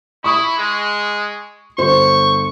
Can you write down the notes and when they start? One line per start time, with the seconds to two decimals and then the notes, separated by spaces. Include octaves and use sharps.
0.24 E4 C#6 D#6
0.58 G#3
1.78 G1 C5 C#6